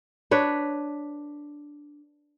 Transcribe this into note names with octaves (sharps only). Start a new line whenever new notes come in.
D4 B4 C#5